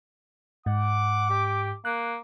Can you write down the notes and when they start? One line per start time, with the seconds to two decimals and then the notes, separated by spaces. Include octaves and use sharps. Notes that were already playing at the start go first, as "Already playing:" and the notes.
0.66 G#2 F#5 D6
1.30 G4
1.85 A#3 F#6